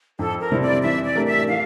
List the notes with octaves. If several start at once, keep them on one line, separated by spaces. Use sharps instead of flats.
F2 A4
A#4
C3 G3 C4 E4
D5
E3 E5
D5
A3 D4 G4 A#4
E5
E3 F5